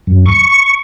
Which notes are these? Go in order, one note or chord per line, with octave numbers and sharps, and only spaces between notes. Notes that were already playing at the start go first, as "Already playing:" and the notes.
F#2
C#6